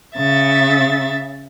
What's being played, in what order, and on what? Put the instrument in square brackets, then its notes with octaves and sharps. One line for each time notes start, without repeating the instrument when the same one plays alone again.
[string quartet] C#3 E5 A6